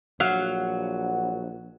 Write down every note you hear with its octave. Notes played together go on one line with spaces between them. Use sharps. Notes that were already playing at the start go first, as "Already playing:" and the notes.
A#1 F#3 F5 F#5